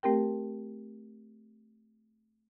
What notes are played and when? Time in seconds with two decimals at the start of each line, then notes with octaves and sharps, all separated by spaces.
0.03 A3 C4 G4 A#4 G5